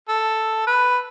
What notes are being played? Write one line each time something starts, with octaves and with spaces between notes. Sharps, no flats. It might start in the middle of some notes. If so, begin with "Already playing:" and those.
A4
B4